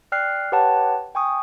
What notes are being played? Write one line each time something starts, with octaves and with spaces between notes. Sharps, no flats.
D5 G5 F6 F#6 C7
G4 B4 C#5 F#5 G5 A5
G5 G#5 C#6 D#6